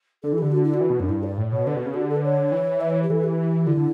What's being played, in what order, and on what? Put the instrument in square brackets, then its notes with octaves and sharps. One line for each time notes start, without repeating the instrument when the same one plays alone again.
[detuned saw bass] D3 [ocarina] A4
[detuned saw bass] E3
[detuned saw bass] D3 [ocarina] G4
[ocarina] F#4
E4
F#4
[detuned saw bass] E3
B2
[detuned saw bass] F#2 [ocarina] D4
[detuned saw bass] G2 [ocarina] E4
[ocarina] D5
[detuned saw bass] A2
[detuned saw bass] B2 [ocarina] C#5
[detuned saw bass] D3 [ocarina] B4
[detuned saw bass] B2
C#3
[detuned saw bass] D3 [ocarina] F#4
[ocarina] G4
A4
B4
C#5
[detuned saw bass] E3
[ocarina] E5
C#5
G4
[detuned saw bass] E3 [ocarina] A4
[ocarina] G4
[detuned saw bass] D3 [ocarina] E4
[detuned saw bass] D3